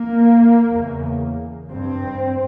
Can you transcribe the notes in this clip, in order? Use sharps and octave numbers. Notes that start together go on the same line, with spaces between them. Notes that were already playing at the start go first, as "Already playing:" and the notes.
Already playing: A#3
E2 C#3
G2 C4